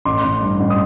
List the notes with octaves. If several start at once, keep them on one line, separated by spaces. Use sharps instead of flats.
A1 C6 D6
A1
G2
A1
D#6